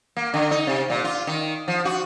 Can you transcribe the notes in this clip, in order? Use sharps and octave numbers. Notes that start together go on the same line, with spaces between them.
A#3
D3
D#4
C3
A#2
F4
D#3
F3
F#4